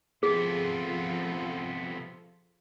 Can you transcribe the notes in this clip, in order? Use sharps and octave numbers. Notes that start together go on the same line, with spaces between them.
C3 F3 B3 F4 G#4 A4